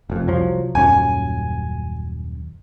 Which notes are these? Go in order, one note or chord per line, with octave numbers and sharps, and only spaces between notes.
F1 F2
C2 F3 F#3
D#1 F#2 C#4 G#5